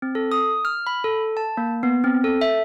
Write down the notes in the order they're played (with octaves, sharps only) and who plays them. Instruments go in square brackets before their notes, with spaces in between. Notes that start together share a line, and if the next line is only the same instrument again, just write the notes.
[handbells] C4
A4
D#6
F6
B5
A4
A5
A#3
B3
C4
A4
E5